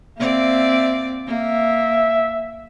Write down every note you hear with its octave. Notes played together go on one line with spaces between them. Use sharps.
A#3 C4 D5 E5
A#3 E5